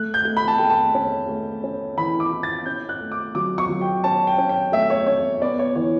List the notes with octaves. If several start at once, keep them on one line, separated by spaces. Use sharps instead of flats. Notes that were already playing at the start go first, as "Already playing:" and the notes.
Already playing: A3 F#6
G6
A3
B5
A5
A3 G5
A5
C#4
A3
C#4
E3 B5
D6
E4
A6
C#4 G6
F#6
A3
D6
F#3 D6
C#6
F#3
G5
C#4 A5
G5
C#4
G5
A3 E5
C#5
C#4 C#5
B3 D5
C#5
E3 C#5